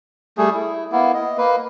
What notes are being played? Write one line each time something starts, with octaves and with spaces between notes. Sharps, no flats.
G3 A3 G#4
E4
A#3 B3 E4
D#5
A#3 B4